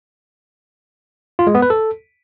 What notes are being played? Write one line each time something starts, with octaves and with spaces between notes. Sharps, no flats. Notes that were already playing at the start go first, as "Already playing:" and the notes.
F4
G#3
B3
B4
A4